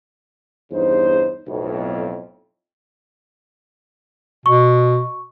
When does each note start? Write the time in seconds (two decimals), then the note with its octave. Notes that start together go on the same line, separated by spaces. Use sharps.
0.72 E2 G2 C#3 D#4 C5
1.47 B1 F2 A2
4.46 B2 C#6